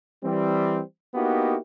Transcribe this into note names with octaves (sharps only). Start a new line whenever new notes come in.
E3 G3 C4
A#3 B3 D#4 E4 F#4 G4